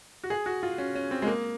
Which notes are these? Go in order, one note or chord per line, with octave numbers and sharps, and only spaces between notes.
F#4
G#4
F#4
F4
C#4
C#4
C4
G#3
A#3